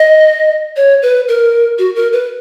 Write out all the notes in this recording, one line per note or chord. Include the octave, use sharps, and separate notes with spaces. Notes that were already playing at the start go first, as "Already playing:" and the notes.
Already playing: D#5
C#5
B4
A#4
F#4
A#4
B4